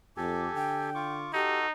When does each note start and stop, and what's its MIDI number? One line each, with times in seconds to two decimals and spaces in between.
0.17 0.48 41
0.17 0.90 67
0.17 0.90 69
0.17 0.90 80
0.17 0.55 86
0.55 1.34 50
0.55 1.14 79
0.95 1.32 65
0.95 1.32 85
0.95 1.32 86
1.33 1.72 63
1.33 1.67 66
1.33 1.58 67
1.33 1.67 69